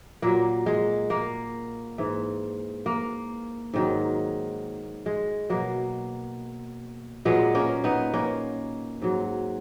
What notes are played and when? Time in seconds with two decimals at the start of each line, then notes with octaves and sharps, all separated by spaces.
0.22 A#2 F#3 A#3
0.66 G#3
1.10 A#3
1.98 G#2 E3
2.86 A#3
3.73 G#2 D#3 F#3
5.06 G#3
5.50 B2 F#3 A#3
7.25 A#2 F#3 G#3 B3
7.55 A#3 C#4
7.84 B3 D#4
8.14 A#3 C#4
9.02 G#2 F#3